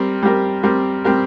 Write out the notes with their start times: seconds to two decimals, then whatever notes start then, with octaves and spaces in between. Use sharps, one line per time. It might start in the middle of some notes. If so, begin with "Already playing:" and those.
Already playing: G3 C4 G4 A#4
0.22 G3 C4 G4 A#4
0.63 G3 C4 G4 A#4
1.04 G3 C4 G4 A#4